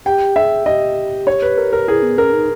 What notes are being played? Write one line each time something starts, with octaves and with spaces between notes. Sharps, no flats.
G4 G5
G#4 E5
G4 D#5
C#5
B4
A#4
A#4
E4 G#4
B3
C#4 A#4
D#4